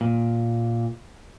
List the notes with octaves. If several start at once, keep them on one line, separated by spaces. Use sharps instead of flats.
A#2